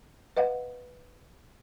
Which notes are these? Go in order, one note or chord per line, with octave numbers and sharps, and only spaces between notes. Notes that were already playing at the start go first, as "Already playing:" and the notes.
B4 D#5 F5 F#5